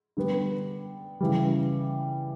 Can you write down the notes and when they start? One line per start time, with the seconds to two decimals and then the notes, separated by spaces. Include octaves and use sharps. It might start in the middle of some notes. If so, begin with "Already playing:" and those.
0.17 D3 G3 B3
1.21 C#3 E3 G3